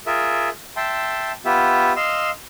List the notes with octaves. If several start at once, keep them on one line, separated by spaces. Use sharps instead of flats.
F4 G#4 A#4 E5
E5 G5 A5 C6
B3 F4 G4 E5
D#5 F5 C6 E6